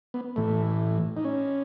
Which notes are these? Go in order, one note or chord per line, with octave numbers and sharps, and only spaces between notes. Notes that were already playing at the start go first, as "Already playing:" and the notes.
B3
A2 E3 A3
D#4
C#4